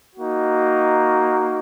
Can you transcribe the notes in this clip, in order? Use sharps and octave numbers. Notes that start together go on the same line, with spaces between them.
A#3 D#4 F#4